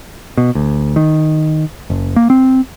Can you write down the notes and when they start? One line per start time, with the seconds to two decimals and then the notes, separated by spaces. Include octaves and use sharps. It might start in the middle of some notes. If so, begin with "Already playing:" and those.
0.37 B2
0.55 D2
0.96 D#3
1.90 F#1
2.16 A#3
2.30 C4